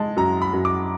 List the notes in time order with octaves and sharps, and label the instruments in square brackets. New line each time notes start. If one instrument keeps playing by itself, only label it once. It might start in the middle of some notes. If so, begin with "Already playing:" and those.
Already playing: [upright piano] G#3 [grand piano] A5
[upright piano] F#2 [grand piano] A#5
[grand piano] B5
[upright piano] F#2
[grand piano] D6